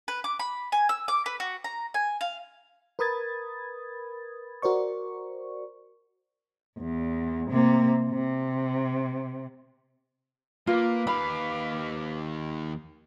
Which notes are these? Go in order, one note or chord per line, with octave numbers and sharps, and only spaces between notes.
B4
D6
B5
G#5
E6
D6
B4
F#4
A#5
G#5
F5
A#4 B4 B5 D#6 G#6 A6
F#4 A#4 C5 D5 C#6
E2
C3 A#3
C3
A#3 F4 B4 D6
D#2 F5 B5